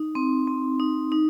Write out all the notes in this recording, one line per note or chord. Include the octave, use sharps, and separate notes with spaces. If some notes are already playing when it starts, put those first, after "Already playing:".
Already playing: D#4
C4
C4
D#4
D#4